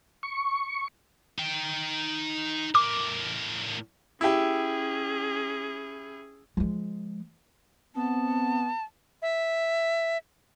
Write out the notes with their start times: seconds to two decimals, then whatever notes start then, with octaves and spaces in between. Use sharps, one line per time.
0.23 C#6
1.38 D#4 G5
2.75 A2 A#4 D6
4.21 C#4 E4 G4 G#4
6.57 F3 G#3
7.96 B3 C4 A5
9.22 E5